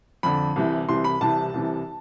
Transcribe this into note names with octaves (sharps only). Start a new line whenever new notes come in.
F2 D3 B5
C2 C3 E3
C2 C3 E3 C6
B5
C2 C3 E3 A5
C2 C3 E3